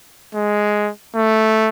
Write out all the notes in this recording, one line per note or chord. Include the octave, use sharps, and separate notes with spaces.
G#3
A3